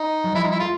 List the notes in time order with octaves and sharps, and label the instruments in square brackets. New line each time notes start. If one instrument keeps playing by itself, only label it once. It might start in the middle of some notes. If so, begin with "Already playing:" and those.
Already playing: [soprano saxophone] D#4
[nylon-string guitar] F#3
[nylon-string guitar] F3 G3 [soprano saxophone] E4
[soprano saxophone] D#4
E4
[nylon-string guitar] A3 [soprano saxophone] F4